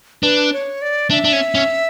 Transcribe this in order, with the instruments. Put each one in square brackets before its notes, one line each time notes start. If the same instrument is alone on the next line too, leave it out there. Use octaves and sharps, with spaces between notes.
[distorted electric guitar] D4 [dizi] B4
[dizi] C#5
D5
[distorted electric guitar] D4 [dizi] E5
[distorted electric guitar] D4
C#4
C#4